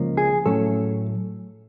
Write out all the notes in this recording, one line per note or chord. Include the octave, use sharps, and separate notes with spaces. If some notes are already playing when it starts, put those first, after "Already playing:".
Already playing: C#2 C#3 F3 A#3
G#4
A2 F#3 A3 C#4 A4